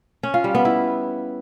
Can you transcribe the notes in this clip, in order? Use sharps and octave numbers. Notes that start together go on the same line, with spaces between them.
C#4
F4
G3
B3
E4